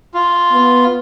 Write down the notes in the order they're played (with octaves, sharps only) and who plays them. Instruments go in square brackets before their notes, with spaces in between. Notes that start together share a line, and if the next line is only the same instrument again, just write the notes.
[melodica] F4
[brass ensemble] B3